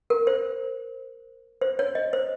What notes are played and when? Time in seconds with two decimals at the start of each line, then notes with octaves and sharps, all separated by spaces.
0.10 A#4
0.27 C5
1.61 C5
1.79 C#5
1.95 D#5
2.13 C5